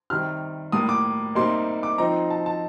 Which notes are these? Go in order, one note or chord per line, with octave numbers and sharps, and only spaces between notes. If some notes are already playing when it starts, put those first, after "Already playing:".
C3 D#3 G3 F6
A2 G3 A#3 D#6
D6
C3 G3 A#3 D#4 C6
D6
F3 C4 D#4 A#5
A5
A5